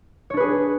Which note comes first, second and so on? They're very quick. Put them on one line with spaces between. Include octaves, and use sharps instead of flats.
C#5 D4 B4 G#4